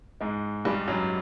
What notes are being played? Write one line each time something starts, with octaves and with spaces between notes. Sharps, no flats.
G#2 G#3
G2 G3
F#2 F#3